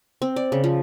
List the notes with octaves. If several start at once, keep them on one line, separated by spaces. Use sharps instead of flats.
C4
D5
C#3
F3